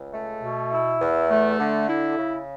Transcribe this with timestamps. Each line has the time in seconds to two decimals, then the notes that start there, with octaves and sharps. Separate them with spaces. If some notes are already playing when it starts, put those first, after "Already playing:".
Already playing: C#2
0.13 A3
0.42 B2
0.72 E4
1.01 E2
1.29 A3
1.59 D3
1.88 E4
2.18 C#3